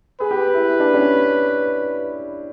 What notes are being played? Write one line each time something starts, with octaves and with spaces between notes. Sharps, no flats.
G#4 B4
G4
E4
D4
C#4